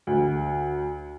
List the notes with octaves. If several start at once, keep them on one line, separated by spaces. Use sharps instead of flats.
D2